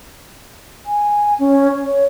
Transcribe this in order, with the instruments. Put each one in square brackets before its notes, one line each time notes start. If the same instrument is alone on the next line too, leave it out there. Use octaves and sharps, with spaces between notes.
[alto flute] G#5
C#4
C#5